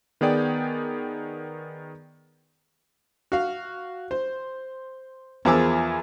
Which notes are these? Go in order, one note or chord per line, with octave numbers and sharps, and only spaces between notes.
D#3 B3 G#4 D5 G5
F#4 F5
C5
E2 F3 G#4 A#4 D6 E6